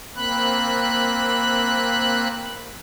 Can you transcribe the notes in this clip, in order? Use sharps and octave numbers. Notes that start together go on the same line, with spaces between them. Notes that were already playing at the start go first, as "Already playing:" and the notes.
A#3 C4 B5 F#6